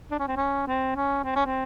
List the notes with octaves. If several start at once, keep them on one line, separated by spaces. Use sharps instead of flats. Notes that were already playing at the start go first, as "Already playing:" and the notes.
D4
C#4
C4
C#4
C4
C#4
C4
C#4
C4